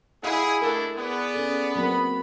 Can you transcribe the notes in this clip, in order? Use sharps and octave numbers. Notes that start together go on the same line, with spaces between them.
E4 G#4 D#5 F5 F#5
A3 D4 A4 A#4
B3 G#4 D5
C#4 A4
F#3 A#3 C4 B5